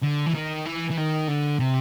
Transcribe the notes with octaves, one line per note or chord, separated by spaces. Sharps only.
D3
E3
D#3
E3
E3
D#3
D3
C3